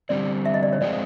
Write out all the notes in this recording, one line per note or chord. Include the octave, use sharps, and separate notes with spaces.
D3 G3 C4 D5
E5
D#5
D5
C#5
F3 G#3 C4 F4 D5